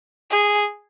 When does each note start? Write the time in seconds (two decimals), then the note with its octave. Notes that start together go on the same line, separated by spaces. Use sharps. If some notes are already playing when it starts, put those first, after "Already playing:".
0.30 G#4